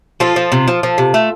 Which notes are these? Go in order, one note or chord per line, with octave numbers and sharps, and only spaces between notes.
F3 F4 A4
F3
C3
F3
F3
C3
A3